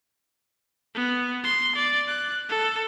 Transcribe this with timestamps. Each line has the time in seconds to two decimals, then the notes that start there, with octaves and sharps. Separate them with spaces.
0.95 B3
1.43 C6
1.75 D5
2.07 F#6
2.49 A4